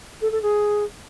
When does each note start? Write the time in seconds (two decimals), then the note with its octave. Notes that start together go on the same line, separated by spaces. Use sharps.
0.21 A4
0.31 A4
0.42 G#4